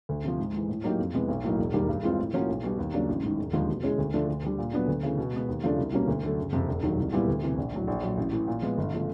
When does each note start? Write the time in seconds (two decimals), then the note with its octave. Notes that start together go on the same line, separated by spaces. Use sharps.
0.09 D2
0.24 C3 F3
0.39 G#2
0.53 E3 G#3
0.69 A2
0.84 F#3 A#3 D#4 G4
0.99 F2
1.14 C3 E3 G#3 B3
1.28 B1
1.44 A2 F#3 A#3 D#4
1.59 E1
1.73 D#2 D#3 G3 A#3
1.89 G2
2.03 E3 G#3 C4 F4
2.18 A2
2.34 F3 A#3 C#4 F#4
2.49 B1
2.63 B2 G3
2.79 D#2
2.94 C#3 F#3 A#3 D4
3.08 A1
3.23 G#2 D#3
3.38 E1
3.53 D#2 D3 F3 G#3
3.69 B2
3.83 G#3 C#4 E4 G#4
3.98 D2
4.14 D3 F3 A3 D4
4.28 D2
4.43 D3 G3
4.58 A#2
4.73 F#3 B3 D4
4.88 D2
5.03 C#3 E3 A3
5.18 B2
5.33 G#3 B3
5.48 D#2
5.63 C#3 F3 A3 D4
5.78 C2
5.93 B2 G3 A#3 C#4
6.08 D2
6.23 D3 F#3 A3
6.38 F#1
6.52 F2 C3
6.68 E1
6.83 D#2 D#3 F#3
6.98 C2
7.13 A#2 G3 B3 E4
7.28 D2
7.43 C3 E3
7.58 A#1
7.73 A2 F#3
7.87 A#1
8.02 A#2 F#3
8.18 A1
8.32 A2 E3
8.48 A#2
8.62 F3 G#3 B3
8.78 G1
8.93 C#3 F3 A3